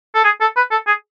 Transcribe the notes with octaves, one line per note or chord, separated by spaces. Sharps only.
A4
G#4
A4
B4
A4
G#4